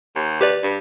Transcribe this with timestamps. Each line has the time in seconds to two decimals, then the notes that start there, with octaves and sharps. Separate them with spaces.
0.16 D#2
0.41 G4 B4 D5
0.63 G2